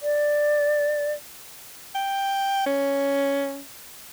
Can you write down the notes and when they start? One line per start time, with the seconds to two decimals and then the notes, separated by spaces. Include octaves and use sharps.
0.02 D5
1.95 G5
2.66 C#4